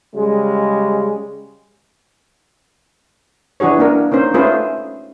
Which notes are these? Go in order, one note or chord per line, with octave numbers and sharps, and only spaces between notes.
C#3 G3 G#3
E3 D4 F#4 G#4 C#5
A#3 D4 A#4
A#3 C#4 D#4 C5
A3 C#4 F4 G#4 B4 C5